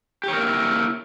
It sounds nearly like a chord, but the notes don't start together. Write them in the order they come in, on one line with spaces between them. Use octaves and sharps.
G4 C#5 A#4 A#3 E4